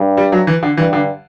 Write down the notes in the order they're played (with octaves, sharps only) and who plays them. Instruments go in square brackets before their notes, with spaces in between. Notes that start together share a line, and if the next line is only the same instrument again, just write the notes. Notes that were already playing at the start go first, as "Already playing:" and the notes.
Already playing: [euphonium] G2
[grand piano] G3
F#3
E3
D3
[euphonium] G2 [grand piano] E3
[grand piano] D3